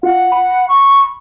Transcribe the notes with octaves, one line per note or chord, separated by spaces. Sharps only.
F4 F#5
B5
C#6